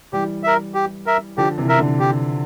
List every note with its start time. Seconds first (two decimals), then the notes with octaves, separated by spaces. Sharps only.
0.13 E3 G3 G4
0.43 A#4 E5
0.74 G4
1.06 A#4 E5
1.38 D3 F3 G4
1.58 C3 E3
1.69 A#4 E5
1.79 D3
2.00 G4